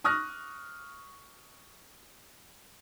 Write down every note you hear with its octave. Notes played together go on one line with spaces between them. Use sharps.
C#6 D#6 F6 F#6 A#6